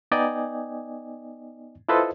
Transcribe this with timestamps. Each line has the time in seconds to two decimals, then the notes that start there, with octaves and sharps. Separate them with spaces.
0.11 B3 D#4 D5 D#5 G5 G#5
1.89 E4 F4 A4 B4 C5 D#5